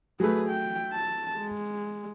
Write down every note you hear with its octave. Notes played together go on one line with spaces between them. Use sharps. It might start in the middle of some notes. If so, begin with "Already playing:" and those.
F#3 A3 G#4 B4
G5
A5
G#3